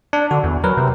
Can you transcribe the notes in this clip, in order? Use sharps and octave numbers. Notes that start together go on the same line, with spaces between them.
D4
D3 F#4
E2
F#3 A#4 B4
C3